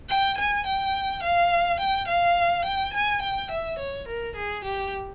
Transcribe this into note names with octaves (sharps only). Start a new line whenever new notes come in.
G5
G#5
G5
F5
G5
F5
G5
G#5
G5
E5
C#5
A#4
G#4
G4